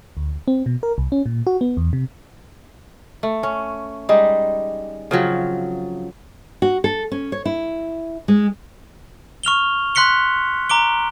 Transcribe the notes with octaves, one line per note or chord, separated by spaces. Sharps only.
D2
C4
B2
A#4
C2
C#4
A#2
F#4
B3
E2
C3
A3
C#4
G3 G#3 D#4
C#3 F3 F#3 C4
F#4
A4
C#4
C#5
E4
G#3
C#6 F6 F7 G7
C6 F#6 B6 C#7 G7
A#5 D6 D7 G7